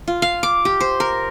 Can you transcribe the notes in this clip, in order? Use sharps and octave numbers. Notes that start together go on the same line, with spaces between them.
F4
F5
D6
G4
C5
A#4